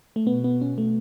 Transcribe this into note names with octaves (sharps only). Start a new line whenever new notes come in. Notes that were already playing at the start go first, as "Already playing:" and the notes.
A3
B2 B3
B3
C#4
A3